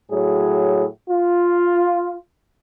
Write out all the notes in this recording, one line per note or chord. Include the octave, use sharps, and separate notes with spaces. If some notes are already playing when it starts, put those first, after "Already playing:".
A2 F#3 F#4 G#4
F4